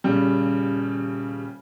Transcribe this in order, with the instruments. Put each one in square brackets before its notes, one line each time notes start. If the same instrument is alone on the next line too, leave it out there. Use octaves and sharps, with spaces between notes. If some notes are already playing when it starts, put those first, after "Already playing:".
[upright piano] D#1 C#3 G3